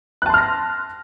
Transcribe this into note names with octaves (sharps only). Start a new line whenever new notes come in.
A5 C6 F6 F#6 A#6